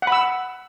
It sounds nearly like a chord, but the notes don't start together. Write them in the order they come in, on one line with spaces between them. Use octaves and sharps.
F#5 B5 E6